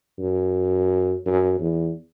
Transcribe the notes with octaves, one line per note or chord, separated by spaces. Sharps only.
F#2
F#2
E2